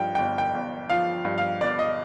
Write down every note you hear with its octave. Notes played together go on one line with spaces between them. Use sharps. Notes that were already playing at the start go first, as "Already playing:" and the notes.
Already playing: G2 F3 G5
G1 G5
G5
G1
F3 F5
G2
F5
G1 D5
D#5